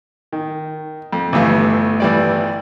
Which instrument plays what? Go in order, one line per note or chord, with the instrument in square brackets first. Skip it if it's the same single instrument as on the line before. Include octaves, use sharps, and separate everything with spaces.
[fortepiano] D#3
F2
[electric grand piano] G1 A3 [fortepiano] E3 G4 F5
[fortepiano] E3 G3 D5